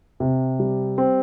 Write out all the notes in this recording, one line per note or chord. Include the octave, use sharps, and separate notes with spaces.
C3
G3
C4